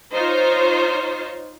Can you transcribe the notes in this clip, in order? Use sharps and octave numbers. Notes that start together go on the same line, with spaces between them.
D#4 F4 C5 C#5